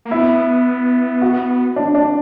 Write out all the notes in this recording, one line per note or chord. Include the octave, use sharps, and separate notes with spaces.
A#3
B3 E4
F#4
D4
D4